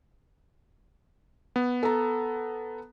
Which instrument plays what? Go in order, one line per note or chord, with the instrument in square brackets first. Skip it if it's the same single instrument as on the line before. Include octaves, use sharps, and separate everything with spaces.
[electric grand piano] B3
[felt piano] A4 A#5